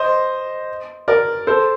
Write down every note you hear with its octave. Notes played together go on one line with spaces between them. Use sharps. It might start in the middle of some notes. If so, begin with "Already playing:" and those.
Already playing: C5 D#5
A#4 D5
A4 C5